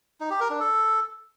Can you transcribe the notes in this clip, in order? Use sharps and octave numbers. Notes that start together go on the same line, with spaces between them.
D#4
G4
A#4
D4
A4